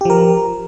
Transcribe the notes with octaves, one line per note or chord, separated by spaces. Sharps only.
F3 G4 A#4